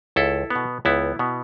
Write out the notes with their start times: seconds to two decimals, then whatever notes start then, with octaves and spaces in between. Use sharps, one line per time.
0.16 C#2 E4 A4
0.50 B3
0.56 B2
0.85 C#2 B3 E4
1.19 B2 B3